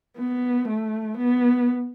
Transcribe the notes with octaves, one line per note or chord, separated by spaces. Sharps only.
B3
A3
B3